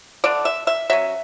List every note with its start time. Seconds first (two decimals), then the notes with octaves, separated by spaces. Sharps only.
0.24 D3 A3 D4 D5
0.45 E5
0.67 E5
0.90 F#3 C#4 E5